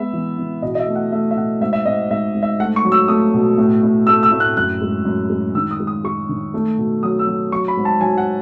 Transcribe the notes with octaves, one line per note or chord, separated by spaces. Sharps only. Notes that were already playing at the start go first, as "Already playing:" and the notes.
Already playing: G#3 B3 E5
E3
E3
B2 D#5
D#5
E5
A3
F#5
A3 E5
E5
B2 F#5
G#2 E5
E5
G#2 D#5
G#2 E5
G#2
E5
A3 F#5
C#6
F#3
E6
A3 D#6
B2
A2
A2
A3 E6
E6
A2
F#6
F#2 F#6
G#3
F#2
G#3
D#3 E6
D#6
G#3
D#6
G#3 C#6
D#3
A3
B2
F#3 D#6
E6
F#3
F#3 C#6
B5
G#2
A5
F#3 G#5
F#5